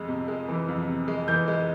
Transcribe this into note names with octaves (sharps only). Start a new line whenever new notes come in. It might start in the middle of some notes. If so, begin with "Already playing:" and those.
Already playing: F2 G#3
C3
G#3
E3
F2
C3
G#3
E3 G6
G#3